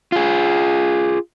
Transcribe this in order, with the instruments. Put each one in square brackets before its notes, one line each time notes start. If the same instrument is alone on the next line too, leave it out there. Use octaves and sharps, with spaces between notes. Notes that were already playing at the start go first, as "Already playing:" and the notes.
[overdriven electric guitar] F4 G#4